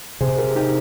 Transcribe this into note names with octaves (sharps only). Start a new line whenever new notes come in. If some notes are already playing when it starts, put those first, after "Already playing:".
C3 G#4 C5
G4 A#4
D#4 G4